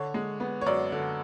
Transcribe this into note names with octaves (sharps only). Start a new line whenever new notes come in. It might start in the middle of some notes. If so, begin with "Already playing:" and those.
Already playing: D3 C#5
G#3
B3
C#5
F#2 D5
D3